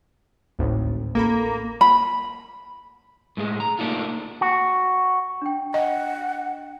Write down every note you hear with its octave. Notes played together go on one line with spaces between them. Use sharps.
G#1 D2 A2
A1 A#3 A4 B5
B5
A2 G#3 F#4 G#4
A#5
A3 A#3 D4 D#4 F4
F#4
D4 G5
D#5 F#5